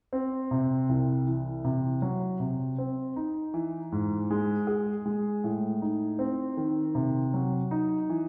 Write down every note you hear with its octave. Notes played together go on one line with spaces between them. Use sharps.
C4
C3
C2
E3
C3
F#3
C3
C4
D#4
E3
G#2
G#3
G#4
G#3
A2
D#4
C4
D#3
C3
F#3
D#4
E3